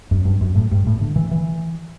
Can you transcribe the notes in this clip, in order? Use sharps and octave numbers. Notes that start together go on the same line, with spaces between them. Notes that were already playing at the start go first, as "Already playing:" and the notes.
F#2
G2
F#2
A2
G2
A2
D3
E3
E3